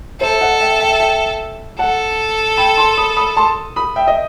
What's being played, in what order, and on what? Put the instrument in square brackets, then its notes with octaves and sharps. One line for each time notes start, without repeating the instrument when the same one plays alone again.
[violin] A4 [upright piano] C5 E5
[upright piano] D#5 F#5
E5 G5
E5 G5
E5 G5
[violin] A4 [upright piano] F#5 A5
[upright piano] G5 B5
A5 C6
B5 D#6
B5 D#6
A5 C6
B5 D#6
E5 G5
D#5